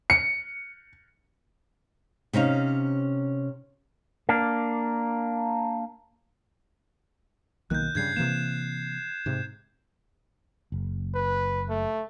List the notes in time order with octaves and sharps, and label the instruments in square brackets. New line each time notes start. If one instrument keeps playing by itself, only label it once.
[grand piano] C#7
[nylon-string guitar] C3 C#4 D#4 F5
[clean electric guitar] A#3 D4
[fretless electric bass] B1 D#3 A#3 [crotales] F#6 G6
[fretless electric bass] G2 C#3 G3 [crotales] G6 G#6 C7
[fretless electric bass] C3 E3 A#3 [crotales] E7
[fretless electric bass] G#2 C3
F#1
[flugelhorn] B4
A3